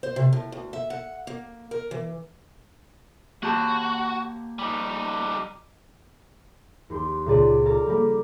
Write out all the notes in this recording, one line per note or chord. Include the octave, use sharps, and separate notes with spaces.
C5
C3
A2
D2
E5
F#5
A#3
A#4
E3
A#3 F#4 G4 A5
G3 D#4
D#2 G4 C6
C#2 A#2 D5 D#7
A4 A#5 D6 F6 A6
G3 A#3